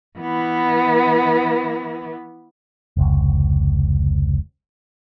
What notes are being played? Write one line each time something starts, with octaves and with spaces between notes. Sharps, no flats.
E3 B3
F1 C#2